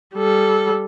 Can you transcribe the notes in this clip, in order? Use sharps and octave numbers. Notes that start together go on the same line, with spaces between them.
G3 A4